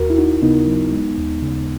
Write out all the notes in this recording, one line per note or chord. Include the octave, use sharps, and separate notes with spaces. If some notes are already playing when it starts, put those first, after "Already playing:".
Already playing: D#2 F#4 A#4
E4
D#2 D#4 F#4
C#3 B3 D#4
F#3
G#3
D#2
C#3